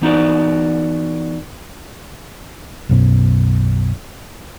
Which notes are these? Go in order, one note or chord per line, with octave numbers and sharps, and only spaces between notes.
E3 B3 D#4 F#4 A#4 D5
B1 F#2 B2